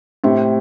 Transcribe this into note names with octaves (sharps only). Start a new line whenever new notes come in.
A2 C3